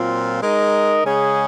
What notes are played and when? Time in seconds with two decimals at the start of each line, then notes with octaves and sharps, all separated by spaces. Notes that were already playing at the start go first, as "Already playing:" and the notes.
Already playing: A#2 F#3 C4 F4
0.41 G#3 D#4 A#4 D#5
1.04 C#3 G#3 C#4 G#4